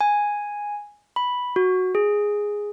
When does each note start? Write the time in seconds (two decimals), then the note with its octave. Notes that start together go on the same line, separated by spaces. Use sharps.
0.01 G#5
1.16 B5
1.56 F#4
1.95 G#4